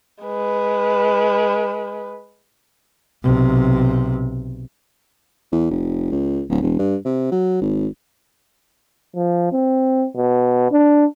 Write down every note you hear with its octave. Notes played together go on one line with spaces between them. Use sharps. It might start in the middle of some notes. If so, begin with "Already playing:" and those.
G#3 B4
B1 C3
E2
F1
C#2
D1
E1
G2
C3
F#3
G#1
F3
C4
B2
D4